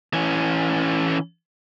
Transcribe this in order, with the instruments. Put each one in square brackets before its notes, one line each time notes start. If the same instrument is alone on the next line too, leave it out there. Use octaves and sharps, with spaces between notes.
[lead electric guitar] E3 C#4